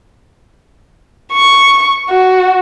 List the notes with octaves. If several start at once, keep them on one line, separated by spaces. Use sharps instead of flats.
C#6
F#4